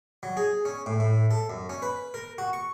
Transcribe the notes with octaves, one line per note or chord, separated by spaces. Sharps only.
F#3
G#4
C#4
A2
A2
A4
F#2
C#4
B4
A#4
F#4
C#6